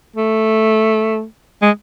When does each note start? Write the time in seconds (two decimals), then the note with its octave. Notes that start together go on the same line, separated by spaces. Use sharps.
0.16 A3
1.62 G#3